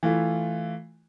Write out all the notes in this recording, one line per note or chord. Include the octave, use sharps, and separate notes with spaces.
E3 A3 F4